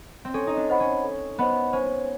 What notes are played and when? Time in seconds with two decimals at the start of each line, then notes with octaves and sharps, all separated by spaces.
0.25 C4
0.34 C#4 A4
0.47 D#4
0.57 D4
0.70 C5 D#5 F#5 B5
0.80 C#4
1.04 A4
1.38 B3 C5 D#5 F#5 B5
1.73 C#4 C5